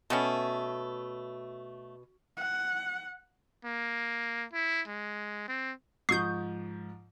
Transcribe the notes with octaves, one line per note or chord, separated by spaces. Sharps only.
B2 A3 B3 C#4
F#5
A#3
E4
G#3
C4
G#2 F3 C#6 D#6 G6 C7